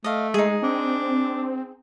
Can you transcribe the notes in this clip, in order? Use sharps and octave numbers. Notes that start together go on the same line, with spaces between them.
A3 D#5 F5
G#3 D#4 G#4
C4 D4